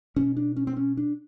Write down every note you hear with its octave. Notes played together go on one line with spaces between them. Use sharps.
B2 C#4
D4
C#4
C4
C#4
D4